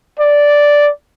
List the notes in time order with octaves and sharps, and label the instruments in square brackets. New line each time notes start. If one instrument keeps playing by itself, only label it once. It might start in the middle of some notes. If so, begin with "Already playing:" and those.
[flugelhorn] D5